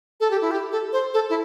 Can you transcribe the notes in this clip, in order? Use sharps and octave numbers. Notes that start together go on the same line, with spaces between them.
A4
G4
E4
G4
A4
C5
A4
E4